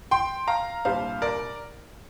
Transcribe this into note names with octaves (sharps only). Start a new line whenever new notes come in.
G5 C6
F5 A#5
C2 A#2 G3 D4 C5 F5
A#4 D5